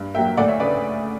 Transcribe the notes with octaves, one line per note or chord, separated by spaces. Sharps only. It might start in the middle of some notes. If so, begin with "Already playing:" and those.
Already playing: G2
F#3 A#3 E5 G5
D2 D5 F#5
C#5 E5
C#3 B4 D5